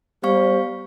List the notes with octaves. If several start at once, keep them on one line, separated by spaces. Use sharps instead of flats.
G3 B3 C5 F5 C#6